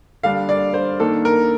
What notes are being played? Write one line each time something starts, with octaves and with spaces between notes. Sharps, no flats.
D3 G3 D4 F5
D5
C5
D#3 A#3 D4 A4
A#4